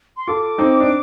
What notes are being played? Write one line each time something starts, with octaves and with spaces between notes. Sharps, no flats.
C6
F4 A4 D6
C4 D#4
D4